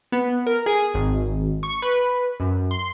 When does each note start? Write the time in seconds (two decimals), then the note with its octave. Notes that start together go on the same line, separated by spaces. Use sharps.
0.12 B3
0.46 A#4
0.66 G#4
0.94 G#1
1.63 C#6
1.82 B4
2.40 F#2
2.71 C6